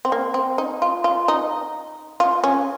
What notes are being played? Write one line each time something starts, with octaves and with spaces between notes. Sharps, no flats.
C4
A#3
C4
D#4
F4
F4
D#4
F4
C#4